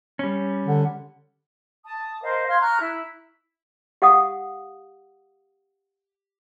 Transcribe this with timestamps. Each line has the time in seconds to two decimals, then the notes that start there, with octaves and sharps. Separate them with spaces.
0.19 G3 C#4
0.67 D3
1.85 A5 D#6
2.21 A#4 C5 D#5 F5
2.48 F5 C6 F6 G#6
2.59 A#5 C#6 F6 F#6
2.79 E4
4.02 G4 F5 F#5 D#6